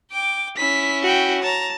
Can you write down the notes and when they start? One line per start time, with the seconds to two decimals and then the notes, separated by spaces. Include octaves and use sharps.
0.11 G5 D6
0.57 C#4 E4 B6
1.03 F#4 G5
1.43 C#5 A5 A#5